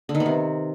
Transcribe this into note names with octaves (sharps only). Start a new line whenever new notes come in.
D3
D#3
B3
C3